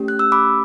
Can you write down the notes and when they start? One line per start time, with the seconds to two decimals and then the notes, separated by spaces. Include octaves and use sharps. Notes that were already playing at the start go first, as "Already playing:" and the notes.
Already playing: A3 C#4 G4
0.08 F#6
0.19 E6
0.32 B5 D6